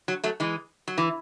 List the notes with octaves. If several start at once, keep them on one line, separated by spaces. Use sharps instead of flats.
F#3
F#3 A3
E3 G#3
F#3
E3